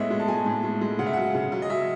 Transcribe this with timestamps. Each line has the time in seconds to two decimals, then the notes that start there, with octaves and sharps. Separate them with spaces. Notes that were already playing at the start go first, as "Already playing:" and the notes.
Already playing: A2 G#3 B3 C#5 D#5 E5
0.10 G#3
0.20 A5
0.28 G#3 G#5
0.46 A2
0.64 G#3
0.81 G#3
0.99 C#3 F#5
1.06 E5
1.13 F#3 F#5
1.35 C#3
1.52 F#3
1.62 D#5
1.70 F#3 E5